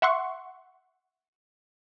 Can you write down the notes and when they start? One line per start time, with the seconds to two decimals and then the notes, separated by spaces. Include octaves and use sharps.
0.02 E5 F#5 C6 C#6